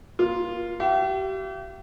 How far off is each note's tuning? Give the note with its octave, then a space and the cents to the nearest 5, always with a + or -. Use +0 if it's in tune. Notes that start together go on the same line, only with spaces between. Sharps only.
A#3 +35 F4 +0
G4 -35 E5 +45